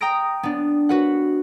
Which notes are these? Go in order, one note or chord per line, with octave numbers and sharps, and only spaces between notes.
G5 A#5 D#6 A#6 D7
B3 D4
F#4 B4 F#5